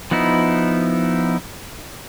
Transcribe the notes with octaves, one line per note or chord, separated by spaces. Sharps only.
F3 B3 D#4 E4